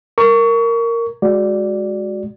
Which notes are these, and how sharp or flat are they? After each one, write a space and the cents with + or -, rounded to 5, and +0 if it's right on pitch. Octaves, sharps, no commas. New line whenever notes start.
A#4 -10 C#6 +25
G#3 +0 F#4 +0 D5 +0